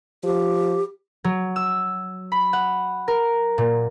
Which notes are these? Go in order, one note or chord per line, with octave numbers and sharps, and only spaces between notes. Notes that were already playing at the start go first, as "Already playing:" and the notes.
F3 G4
F#3
E6
B5
F#5
A#4
A#2